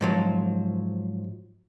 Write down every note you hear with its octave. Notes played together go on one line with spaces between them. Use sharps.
G#2 F3 F#3